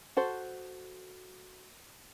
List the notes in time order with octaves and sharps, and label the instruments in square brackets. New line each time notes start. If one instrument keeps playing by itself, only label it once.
[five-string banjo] F#4 A4 C5